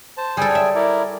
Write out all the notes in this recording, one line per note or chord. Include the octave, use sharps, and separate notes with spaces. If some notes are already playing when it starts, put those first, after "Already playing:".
C5 A5
G3 G#4 A4 G5 G#5
C#5 E5
E4 A#4 D5